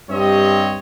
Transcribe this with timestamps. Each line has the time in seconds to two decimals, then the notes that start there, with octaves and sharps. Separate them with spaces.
0.10 G2 C4 G4 C#5 D#5